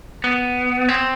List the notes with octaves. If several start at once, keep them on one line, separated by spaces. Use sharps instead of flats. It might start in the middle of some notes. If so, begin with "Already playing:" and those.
B3
C4